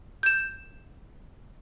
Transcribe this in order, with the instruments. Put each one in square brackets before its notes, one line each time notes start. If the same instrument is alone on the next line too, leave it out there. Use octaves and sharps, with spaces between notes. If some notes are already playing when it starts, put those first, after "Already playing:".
[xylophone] G6 E7